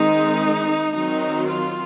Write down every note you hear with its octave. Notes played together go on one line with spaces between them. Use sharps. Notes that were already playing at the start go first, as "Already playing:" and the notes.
Already playing: D#3 G#3 C4 D#4
D#3 F#3 C4 D#4
F4